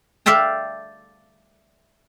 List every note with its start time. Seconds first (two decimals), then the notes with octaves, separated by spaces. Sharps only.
0.26 D5 E5 F5 G5 A5